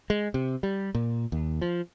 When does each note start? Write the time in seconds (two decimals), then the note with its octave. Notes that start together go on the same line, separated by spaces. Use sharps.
0.10 G#3
0.34 C3
0.63 G3
0.95 A#2
1.32 D#2
1.61 F3